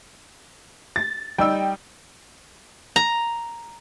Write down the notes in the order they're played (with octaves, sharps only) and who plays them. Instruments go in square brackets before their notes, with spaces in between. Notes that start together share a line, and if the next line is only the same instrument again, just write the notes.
[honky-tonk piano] A6
[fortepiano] G3 D#4 E6 [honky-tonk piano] G5
[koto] A#5